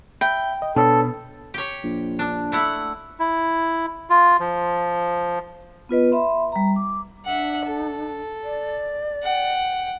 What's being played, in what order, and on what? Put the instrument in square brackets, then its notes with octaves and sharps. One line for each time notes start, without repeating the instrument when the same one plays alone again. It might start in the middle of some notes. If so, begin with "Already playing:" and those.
[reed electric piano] E5 B5 [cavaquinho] G5
[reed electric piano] D#5
[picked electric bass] B2 [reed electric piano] D4 B4 C#5 [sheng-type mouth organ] A4
[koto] G4 C#5
[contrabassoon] A#1
[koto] D4
A3 E4 F#5
[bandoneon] E4
F4
F3
[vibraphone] B3 F4 B4 D#5
E5 B5 C6
G3 A#5
D6
[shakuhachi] D4 [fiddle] E5 F#5
[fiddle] A4
[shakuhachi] D5
[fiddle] F#5 G5